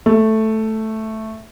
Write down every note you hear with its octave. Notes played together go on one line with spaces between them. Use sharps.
A3